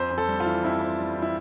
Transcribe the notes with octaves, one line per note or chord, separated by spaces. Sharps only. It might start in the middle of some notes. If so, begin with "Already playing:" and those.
Already playing: F2 C5
F2
A4
G3
F4
E3
F2 E4
F2
G3
E3
E4